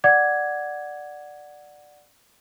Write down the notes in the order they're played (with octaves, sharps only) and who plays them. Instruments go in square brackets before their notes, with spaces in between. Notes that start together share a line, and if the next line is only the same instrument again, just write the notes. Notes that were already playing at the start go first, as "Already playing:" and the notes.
[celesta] D5 F#5 D6 G#6